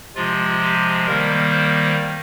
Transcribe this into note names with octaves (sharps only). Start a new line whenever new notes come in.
C3 F3 G#3 F4
G4
D#3 G3 A#3 A#4
C5